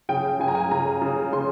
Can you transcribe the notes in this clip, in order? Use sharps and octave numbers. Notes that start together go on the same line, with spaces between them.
C#3 G5
C#3 G#5
A#5
G#5
C#3 A#5
C#3
C#3 C6